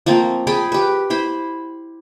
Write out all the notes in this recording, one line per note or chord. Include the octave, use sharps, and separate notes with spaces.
F3 A3 A#3 C4
G#4 G5 A5 B5
G4 B4
E4 C5 B5